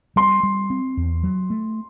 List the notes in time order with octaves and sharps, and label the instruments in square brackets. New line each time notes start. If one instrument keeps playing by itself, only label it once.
[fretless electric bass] G3 [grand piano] C6
[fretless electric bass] G3
C4
E2
F#3
A3